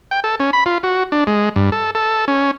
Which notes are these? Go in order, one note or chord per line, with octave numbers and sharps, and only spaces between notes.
G5
A4
C#4
B5
F4
F#4
D4
G#3
G2
A4
A4
C#4